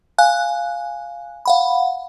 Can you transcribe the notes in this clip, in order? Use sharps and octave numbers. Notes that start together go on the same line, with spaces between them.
F5 G#5 F#6
F5 F#5 B5